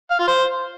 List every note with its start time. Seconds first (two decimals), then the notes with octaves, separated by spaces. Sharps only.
0.11 F5
0.19 F4
0.27 C5